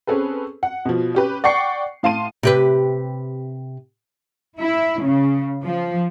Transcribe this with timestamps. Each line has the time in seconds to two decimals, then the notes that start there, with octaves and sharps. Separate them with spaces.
0.07 C4 C#4 G#4 A4 B4
0.63 F#5
0.85 B2 F3
1.15 C#4 G4 B4
1.44 D5 F#5 G5 C#6 C7 C#7
2.03 A2 F5 A5 C6 D#7
2.43 C3 G4 B4
4.61 E4
5.03 C#3
5.64 F3